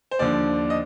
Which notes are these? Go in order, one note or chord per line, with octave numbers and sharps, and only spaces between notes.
C5
D#2 D3 F3 D5
D#5